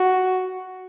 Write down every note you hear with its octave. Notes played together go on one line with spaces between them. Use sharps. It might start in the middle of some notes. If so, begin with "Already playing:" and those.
Already playing: F#4